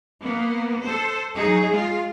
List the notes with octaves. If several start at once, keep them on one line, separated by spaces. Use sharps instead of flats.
A#3 B3
A4 C5
F#3 D#4 G#4
G#3 F4